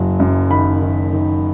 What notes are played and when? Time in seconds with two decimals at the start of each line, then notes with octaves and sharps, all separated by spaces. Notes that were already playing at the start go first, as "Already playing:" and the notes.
Already playing: F#1 F#3
0.20 F#2
0.50 D#3 B5
0.82 D#3
1.13 D#3